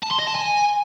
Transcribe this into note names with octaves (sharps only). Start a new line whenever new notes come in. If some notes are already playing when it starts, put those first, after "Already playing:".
A5
C6
D#5
A5
G#5